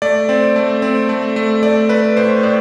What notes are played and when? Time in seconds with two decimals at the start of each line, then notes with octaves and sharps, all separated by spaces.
0.02 A3 D5
0.29 C4
0.56 A3
0.82 C4
1.09 A3
1.36 A3
1.63 A3 D5
1.89 A3 B4
2.16 A2 C5
2.43 A2 D5